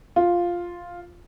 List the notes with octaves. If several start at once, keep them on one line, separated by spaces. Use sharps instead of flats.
F4